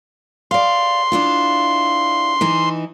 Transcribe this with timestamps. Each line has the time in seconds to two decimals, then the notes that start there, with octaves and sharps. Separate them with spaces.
0.51 D5 F5 C6
1.12 D4 E4 F4
2.41 E3 D#4 E4